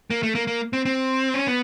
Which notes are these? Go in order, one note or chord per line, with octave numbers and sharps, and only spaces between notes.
A#3
A3
A#3
A#3
C4
C4
C#4
B3